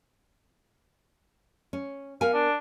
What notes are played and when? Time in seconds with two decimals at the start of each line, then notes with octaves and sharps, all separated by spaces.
1.73 C#4
2.21 B3 A#4 F5 G#5
2.34 D4